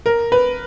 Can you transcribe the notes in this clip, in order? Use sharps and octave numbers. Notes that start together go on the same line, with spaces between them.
A#4
B4